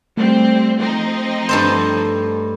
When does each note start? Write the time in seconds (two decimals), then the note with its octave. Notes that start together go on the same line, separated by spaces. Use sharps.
0.17 G3 A3 C4
0.78 F3 C4 D#4
1.49 G2 A4 C5